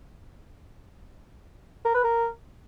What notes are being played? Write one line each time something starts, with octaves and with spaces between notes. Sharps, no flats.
A#4
B4
A#4